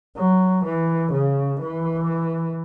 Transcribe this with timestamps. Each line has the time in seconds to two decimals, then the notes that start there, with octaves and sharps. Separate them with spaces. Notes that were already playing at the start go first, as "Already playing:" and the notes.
0.16 F#3
0.64 E3
1.12 C#3
1.60 E3